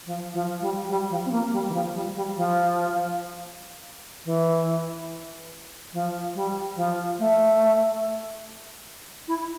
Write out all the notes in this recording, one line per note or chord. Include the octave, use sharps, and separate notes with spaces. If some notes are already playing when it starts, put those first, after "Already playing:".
F3
F3
G3
G3
F3
C4
A#3
G3
E3
F3
G3
G3
F3
E3
F3
G3
F3
A3
E4